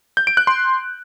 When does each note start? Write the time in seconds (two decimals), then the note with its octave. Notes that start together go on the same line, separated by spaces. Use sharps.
0.17 G6
0.27 D7
0.37 F#6
0.47 C6